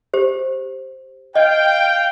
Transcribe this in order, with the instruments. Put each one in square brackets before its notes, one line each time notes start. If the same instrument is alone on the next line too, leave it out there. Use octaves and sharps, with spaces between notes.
[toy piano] G4 C5
[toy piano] D#5 [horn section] F5 G5